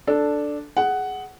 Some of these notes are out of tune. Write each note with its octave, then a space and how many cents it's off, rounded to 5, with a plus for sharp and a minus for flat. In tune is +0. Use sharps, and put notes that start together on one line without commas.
D4 +0 A4 +0
G#4 +10 F#5 +10